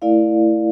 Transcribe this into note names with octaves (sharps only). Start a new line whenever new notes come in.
A3 E4 A#4 D5 F5